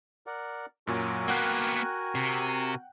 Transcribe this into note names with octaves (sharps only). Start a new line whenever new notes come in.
A#4 D5 F#5
F#2 A#2 F#3 F#4 A#4 G#5
A#3 B3 F#5 G5 F#6
C3